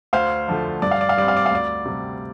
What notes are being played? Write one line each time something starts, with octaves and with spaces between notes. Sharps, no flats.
D2 C5 F5
D3 F3 A3
G2 D5
F5
D5
F5
G3 C4 D5
F5
D5
F5
D2 D5
C3 G3